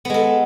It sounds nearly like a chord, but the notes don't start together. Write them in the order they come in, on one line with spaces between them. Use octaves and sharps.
B3 G#3 A4